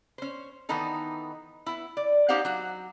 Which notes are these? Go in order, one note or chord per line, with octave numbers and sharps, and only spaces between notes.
C#4 C5
D#3 E3 B3 D#4 A4
B3 E4
D5
C#4 D#4 G4 C5 F5 F#5
F#3 F#4